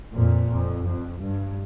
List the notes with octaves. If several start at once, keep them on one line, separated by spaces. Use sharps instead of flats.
F2 A#2
F2
F2
G2